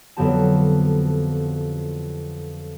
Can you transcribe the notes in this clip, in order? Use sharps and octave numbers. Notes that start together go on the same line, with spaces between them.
F2 D3 F#3 B3 G4 A5